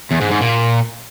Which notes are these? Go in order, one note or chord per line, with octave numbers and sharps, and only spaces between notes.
E2
G#2
G#2
A#2